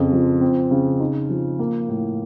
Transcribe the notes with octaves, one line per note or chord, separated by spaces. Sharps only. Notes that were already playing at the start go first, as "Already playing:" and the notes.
Already playing: F2 C#3
F3
C4
C#3
D#4
F3
A#3
A2